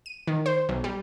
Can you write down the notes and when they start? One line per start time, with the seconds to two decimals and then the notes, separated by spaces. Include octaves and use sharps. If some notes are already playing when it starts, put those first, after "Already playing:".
0.06 D#7
0.27 D#3
0.46 C5
0.69 B1
0.84 G3